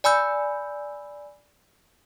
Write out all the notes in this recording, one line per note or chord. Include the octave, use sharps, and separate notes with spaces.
D5 G#5 B5 E6 G6